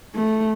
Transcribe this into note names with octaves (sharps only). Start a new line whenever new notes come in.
A3